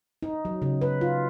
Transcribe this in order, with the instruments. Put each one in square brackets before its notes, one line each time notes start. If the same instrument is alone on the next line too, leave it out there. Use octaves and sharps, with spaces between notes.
[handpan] D#4
F#3
C#3
B4
F4